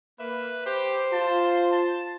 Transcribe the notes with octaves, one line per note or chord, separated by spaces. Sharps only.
A#3 B4 E5
G4 C5
F4 A5
A5